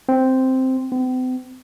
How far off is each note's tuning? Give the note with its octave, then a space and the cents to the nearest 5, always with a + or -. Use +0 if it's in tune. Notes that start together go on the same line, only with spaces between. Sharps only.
C4 -5
C4 -45